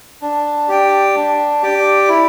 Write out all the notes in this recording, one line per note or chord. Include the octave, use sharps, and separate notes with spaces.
D4
G4 D5 G5
D4
G4 D5 G5
E4